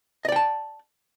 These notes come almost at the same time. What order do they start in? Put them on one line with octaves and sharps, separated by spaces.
D#5 D5 G5 A5